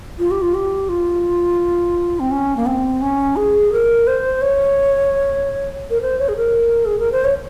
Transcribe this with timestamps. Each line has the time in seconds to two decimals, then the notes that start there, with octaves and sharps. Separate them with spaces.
0.19 F4
0.31 G4
0.42 F4
0.54 G4
0.89 F4
2.20 C4
2.31 C#4
2.56 A#3
2.66 C4
3.02 C#4
3.36 G#4
3.72 A#4
4.07 C5
4.42 C#5
5.90 A#4
6.02 C5
6.19 C#5
6.29 G#4
6.36 A#4
6.86 G#4
7.00 A#4
7.12 C5
7.25 C#5